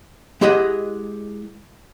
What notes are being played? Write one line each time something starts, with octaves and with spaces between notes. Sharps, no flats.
G#3 E4 G4 G#4 D#5 F#5